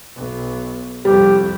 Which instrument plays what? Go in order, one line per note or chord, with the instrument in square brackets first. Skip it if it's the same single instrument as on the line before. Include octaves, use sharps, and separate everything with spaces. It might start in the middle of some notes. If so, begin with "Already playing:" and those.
[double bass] B1
[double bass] C2 F2 [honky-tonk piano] G3 [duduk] G4